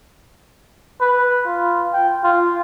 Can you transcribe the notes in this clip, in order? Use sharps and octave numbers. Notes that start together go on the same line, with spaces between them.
B4
F4
G5
F4